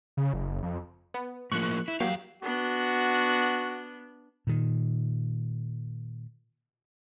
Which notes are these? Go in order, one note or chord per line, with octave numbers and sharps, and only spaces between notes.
C#3
F#1
F2
B3
A2 F3 A#3 C#6 F#6
E4
E2 F#3 A#3 G4 F5
B3 D4 F#4
A#2 D#3